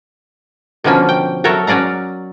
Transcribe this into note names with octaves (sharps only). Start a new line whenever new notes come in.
B2 D3 F3 A#3 C#4
G5
F#3 A4 A#4 C#5 E5
F#3 C#4 D5 F5 A#5